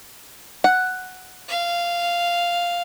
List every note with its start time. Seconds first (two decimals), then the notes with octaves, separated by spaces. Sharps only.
0.64 F#5
1.49 F5